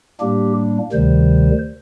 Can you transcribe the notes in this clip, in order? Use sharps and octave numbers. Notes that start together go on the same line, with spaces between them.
A2 G3 A#3 D4 G4
D2 C3 D#3 G3 C5